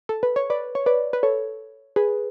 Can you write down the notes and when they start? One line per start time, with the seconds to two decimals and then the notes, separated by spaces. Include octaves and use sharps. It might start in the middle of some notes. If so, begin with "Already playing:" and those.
0.09 A4
0.23 B4
0.36 C#5
0.50 B4 D5
0.75 C#5
0.86 B4 D5
1.13 B4
1.23 A4 C#5
1.96 G#4 B4